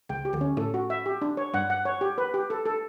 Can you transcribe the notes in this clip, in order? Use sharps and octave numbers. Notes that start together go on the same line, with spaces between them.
C#2 C#3 G5
G4
D2 D3
C#4
A2 A3 A4
F#4
E5
G4
D4
C#5
G2 G3 F#5
F#5
C#5
G4
B4
G4
A4
A4